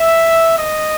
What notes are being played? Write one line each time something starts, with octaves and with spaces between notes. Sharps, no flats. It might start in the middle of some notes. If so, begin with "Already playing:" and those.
Already playing: E5
D#5